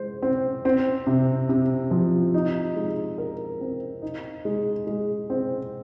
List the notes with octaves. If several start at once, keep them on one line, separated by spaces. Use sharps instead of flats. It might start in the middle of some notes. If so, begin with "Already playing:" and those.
Already playing: G#3 C5
C4
C4
C3
C3
F3
D#4
G#3
A#4
C4
D#4
G#3
G#3
C4